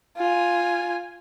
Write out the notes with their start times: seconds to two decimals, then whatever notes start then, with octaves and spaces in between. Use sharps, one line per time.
0.17 F4 G#5